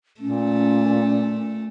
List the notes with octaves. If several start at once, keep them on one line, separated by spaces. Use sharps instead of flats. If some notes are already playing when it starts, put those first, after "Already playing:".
A#2 A3 C#4